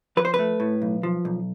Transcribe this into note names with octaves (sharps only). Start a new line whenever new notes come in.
F3 B4
C5
A3 B4
A2
B1
F3
B1